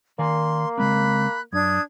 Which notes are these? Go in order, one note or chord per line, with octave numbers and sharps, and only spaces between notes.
D#3 A#3 D5 G#5 C6
C#3 G#3 C4 B5 F#6
F#2 D4 D#6 G#6